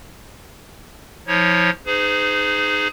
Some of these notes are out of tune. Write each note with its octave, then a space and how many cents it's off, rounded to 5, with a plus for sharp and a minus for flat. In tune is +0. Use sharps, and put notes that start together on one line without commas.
F3 +0 E4 -45 C#5 +0
D#4 -20 G#4 +0 C5 -45